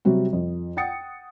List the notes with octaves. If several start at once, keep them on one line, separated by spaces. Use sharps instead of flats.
C3 F#3 G3 C4 F#4
F2
F#5 G5 D#6 A6 C#7